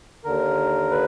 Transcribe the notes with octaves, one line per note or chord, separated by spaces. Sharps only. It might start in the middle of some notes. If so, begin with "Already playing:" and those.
D#2 D3 A#4
B4